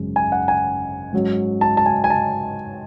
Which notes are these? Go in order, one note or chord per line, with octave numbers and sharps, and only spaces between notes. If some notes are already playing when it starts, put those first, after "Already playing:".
Already playing: G#1 F#2 C#3 G#3
G#5
F#5
G#5
G#2 F#3 C#4
A5
A5
G#5
G#5
A5